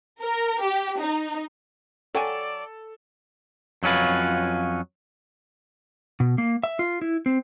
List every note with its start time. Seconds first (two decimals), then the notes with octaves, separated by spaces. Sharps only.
0.21 A#4
0.62 G4
1.00 D#4
2.15 F#3 A4 D5 G5 G#5
3.83 F2 F#3 C#4 F4 B4
6.20 B2
6.38 A#3
6.63 E5
6.79 F4
7.02 E4
7.26 C4